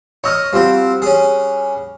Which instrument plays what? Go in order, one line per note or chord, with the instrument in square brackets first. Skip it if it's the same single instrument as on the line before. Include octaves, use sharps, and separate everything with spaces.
[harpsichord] C#5 D#5 [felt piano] C#6 E6 F6
[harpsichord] F3 C4 [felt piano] G3 F#4
[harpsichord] C#4 G#4